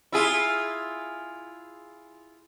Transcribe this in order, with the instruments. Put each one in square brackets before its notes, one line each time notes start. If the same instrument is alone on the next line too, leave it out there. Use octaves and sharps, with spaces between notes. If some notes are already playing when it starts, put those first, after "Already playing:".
[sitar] E4 F4 G#4